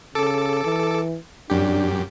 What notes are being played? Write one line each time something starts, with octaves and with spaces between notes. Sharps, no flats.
C#3 A4 D6
E3
F#2 D4 G4